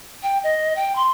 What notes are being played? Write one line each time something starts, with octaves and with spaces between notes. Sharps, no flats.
G5
D#5
G5
C6